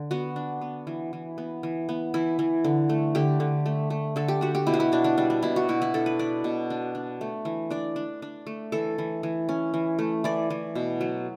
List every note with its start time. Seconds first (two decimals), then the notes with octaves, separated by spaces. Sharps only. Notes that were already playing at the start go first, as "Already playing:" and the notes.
Already playing: D3
0.11 B3 F#4
0.36 D4
0.61 B3
0.87 E3
1.13 E3
1.38 B3
1.63 E3
1.89 B3
2.14 E3 E4
2.39 E3
2.64 D3
2.89 A3
3.15 D3 G4
3.40 D3
3.66 A3
3.90 A3
4.16 D3 A4
4.28 G4
4.41 D4 F#4
4.55 G4
4.67 B2 E4
4.74 F#4
4.80 E4
4.92 B2 D4
5.04 D4
5.18 G3 D4
5.30 D4
5.43 B2 E4
5.56 F#4
5.69 B2 E4
5.82 E4
5.94 D4 A4
6.06 B4
6.19 D4 D5
6.44 B2
6.70 D4
6.95 D4
7.21 A3
7.45 E3
7.70 D4 D5
7.96 D4
8.22 D4
8.47 A3
8.72 E3 A4
8.98 E3
9.23 E3
9.49 C#4
9.74 E3
9.99 A3
10.24 E3 D5
10.50 E3
10.75 B2
11.01 F#3